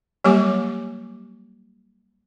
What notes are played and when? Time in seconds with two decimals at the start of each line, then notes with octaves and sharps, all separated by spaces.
0.24 F#3 G3 A#3 G4 G#5 D6